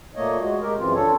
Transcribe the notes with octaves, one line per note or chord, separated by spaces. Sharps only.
A#2 A3 A#3 C#5 D#5
G#3 F#4
G#3 G4 A#4
F#2 C#3 E3 C4 F4
D4 A4 C#5